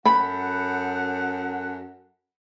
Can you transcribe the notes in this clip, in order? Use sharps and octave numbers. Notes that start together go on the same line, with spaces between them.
F#2 A4 F#5 B5